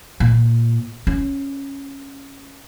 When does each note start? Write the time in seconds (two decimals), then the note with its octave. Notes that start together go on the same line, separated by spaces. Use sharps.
0.20 A#2
1.07 C#4